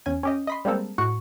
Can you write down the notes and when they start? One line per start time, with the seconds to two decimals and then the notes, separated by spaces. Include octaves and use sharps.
0.06 E2 C#4 G#5
0.23 C#4 G4 D#5
0.47 D#5 B5 C6
0.65 G3 G#3 A#3 C4 A4 A#4
0.98 A2 F#4 F#5 C#6